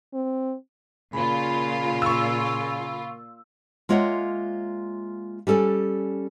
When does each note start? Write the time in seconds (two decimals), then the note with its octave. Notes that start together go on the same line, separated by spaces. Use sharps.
0.14 C4
1.13 A#2 C#3 F4 B5
2.02 C#6 E6
3.89 G#3 A#3 F4 C#5 E5 F#5
5.47 G3 C#4 A4 D5 G#5